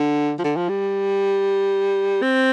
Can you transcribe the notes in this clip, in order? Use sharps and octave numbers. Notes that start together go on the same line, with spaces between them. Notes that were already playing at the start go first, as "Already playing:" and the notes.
Already playing: D3
F3
D3
F3
G3
C4